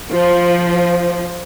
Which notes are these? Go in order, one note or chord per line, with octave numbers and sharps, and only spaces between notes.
F3